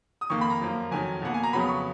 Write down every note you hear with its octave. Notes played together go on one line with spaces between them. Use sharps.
D#6
F2 D#3 A#3 C#6
B5
A#5
F#2 F3 A#3
F2 D#3 F#3 G#5
B2 A#3 F#5
G#5
A#5
F2 C#3 F#3 B3 B5
C#6